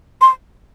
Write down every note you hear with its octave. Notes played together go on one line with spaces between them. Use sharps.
C6